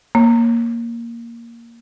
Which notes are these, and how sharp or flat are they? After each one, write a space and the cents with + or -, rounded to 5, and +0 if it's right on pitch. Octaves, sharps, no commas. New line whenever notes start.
A#3 +0 C#5 -10